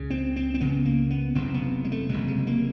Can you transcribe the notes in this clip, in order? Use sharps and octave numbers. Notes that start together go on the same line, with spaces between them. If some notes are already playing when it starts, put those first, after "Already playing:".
Already playing: C#2 C#3
C4
C4
C4
C#2 C#3 B3
A#3
B3
F#1 E2 C3 C4
B3
G#3
A3
F#1 E2 C3 G#3
G#3
A#3